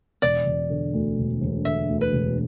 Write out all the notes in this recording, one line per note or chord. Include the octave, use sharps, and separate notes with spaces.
E1 D5
E1
D3
D2
E1
E1
D3 E5
D2
B4
E1